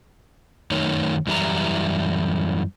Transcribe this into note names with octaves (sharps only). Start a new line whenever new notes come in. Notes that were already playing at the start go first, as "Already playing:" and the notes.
F#2 D#3 A3 D#4 C#5
F#2 E3 G3 E4 A#5